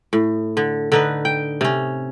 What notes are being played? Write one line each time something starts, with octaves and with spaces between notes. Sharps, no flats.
A2
D3
D3 D#4 B4
G5
C3 C#4